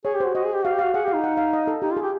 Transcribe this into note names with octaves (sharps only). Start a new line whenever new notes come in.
G#4 C#5
G4
F#4 C5
F#4 D#5
G#4
G4
F#4 F5
G4
F5
F#4
G#4 F#5
G4 F5
D#4
F#5
F5
D#5
A4
D#4 G4
F4
G#4
G4